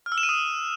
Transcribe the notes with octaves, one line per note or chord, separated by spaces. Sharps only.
F6
E6
E7
D#7
D#6